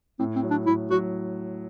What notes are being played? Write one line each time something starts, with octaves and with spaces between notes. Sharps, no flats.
A2 C4
C4
F#3
D4
A2 E4
F#3 F#4